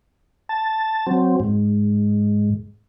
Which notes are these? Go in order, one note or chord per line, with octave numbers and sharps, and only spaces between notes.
A5
F#3 C4
G#2